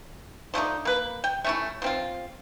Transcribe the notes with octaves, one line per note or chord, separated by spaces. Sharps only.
F3 A3 D4 D#4
A#3 B4
G5
A3 C#4 E4
F3 C4 F4